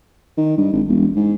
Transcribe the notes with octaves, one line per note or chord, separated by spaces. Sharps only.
D#3
G2
G#1
E1
G#2